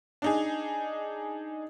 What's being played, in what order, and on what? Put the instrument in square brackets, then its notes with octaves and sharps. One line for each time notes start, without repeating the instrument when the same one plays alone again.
[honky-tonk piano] D4 D#4 G#4